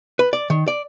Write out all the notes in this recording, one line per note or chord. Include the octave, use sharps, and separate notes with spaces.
B4
D5
D#3
D5